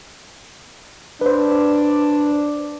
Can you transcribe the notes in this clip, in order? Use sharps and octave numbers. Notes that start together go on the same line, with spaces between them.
D4 B4 C5